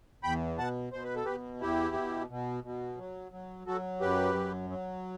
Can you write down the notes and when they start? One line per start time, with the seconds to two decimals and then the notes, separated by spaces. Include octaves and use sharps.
0.23 E2 G5 B5
0.58 B2 F#5 A5
0.92 B2 C5
1.04 B4
1.15 A4
1.25 B2 G4 B4
1.61 E2 E4 G4
1.95 B2
2.30 B2
2.64 B2
2.98 F#3
3.32 F#3
3.67 F#3 F#4 A4
4.01 F#2 G4 B4
4.35 F#3
4.70 F#3